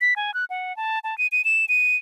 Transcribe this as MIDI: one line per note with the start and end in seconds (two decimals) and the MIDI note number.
0.01 0.14 95
0.16 0.34 80
0.34 0.45 90
0.50 0.75 78
0.77 0.99 81
1.04 1.17 81
1.18 1.27 99
1.32 1.44 99
1.45 1.65 100
1.69 1.96 99